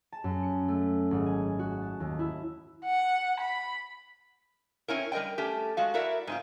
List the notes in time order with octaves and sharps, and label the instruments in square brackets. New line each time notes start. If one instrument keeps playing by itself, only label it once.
[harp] A5
F#2
C#7
A3
G#1
G#5
F#4
A5
D#2
E4
[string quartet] F#5
B5
[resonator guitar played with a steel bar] C4 C#4 E4 A#4
G3 A#4 D#5 G5
A3 C#4 G4
G#3 F#4 F5
E4 F#4 A#4 D5 E5
G#2 C4 F4